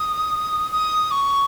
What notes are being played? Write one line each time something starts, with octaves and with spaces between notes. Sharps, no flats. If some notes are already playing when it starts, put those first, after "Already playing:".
Already playing: D#6
D#6
C#6